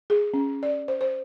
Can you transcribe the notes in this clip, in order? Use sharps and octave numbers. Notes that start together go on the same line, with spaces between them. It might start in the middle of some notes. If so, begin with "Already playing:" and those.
G#4
C#4
D5
C5
C5